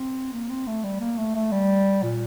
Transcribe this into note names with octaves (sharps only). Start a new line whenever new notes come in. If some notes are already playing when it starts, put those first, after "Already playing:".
Already playing: C4
A#3
C4
A3
G3
A#3
A3
A3
G3
A#2